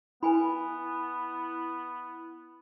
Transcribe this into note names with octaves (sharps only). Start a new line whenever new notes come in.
B3 E4 B4 G#5 B5